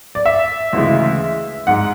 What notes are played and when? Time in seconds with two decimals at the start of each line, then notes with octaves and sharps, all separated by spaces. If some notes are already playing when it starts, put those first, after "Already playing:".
0.15 D5
0.26 E5
0.73 D2 C#3 E3 G#3
1.67 G#2 G#3 F#5